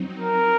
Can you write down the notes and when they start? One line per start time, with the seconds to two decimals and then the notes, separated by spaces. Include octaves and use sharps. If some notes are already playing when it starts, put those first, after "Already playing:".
Already playing: F#3 C4 D#4
0.19 A#4